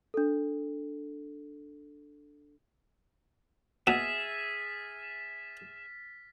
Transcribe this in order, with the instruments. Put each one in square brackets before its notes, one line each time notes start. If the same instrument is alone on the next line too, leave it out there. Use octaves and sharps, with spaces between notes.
[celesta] D4 A4
[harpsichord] B2 [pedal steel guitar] G#4 E5 [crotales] F6 A6 B6